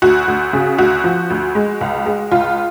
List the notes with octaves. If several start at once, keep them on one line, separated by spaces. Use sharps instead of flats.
D2 F#4
D2
C#3
D2 F#4
F3
D2
G#3
C#2
G#3
C#2 F4